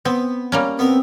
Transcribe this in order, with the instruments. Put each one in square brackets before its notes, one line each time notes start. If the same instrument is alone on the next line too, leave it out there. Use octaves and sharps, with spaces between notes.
[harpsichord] B3 [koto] C4
[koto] G3 A#3 C#4
[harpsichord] B3 A#4 [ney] C4